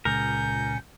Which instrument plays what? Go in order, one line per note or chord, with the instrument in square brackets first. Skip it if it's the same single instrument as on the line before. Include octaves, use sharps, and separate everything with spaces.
[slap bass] C#2 [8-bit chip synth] A#2 G#5 C#7 [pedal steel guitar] A#4 [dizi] G6